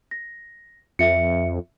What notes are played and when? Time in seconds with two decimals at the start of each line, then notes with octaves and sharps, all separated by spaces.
0.11 A#6
0.99 F2 E5 C#7